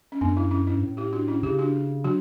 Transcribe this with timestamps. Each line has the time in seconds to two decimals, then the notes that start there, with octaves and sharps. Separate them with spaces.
0.12 C#4
0.21 F#2 B3 D4
0.37 C#4 E4
0.51 C#4 E4
0.67 C#4 E4
0.72 G2
0.83 A2
0.97 E4 G4
1.13 D4 F#4
1.28 C#4 E4
1.43 C#3 E4 G4
1.59 D4 F#4
2.04 F#3 D4 F#4